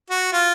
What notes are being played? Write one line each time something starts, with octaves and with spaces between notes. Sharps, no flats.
F#4
F4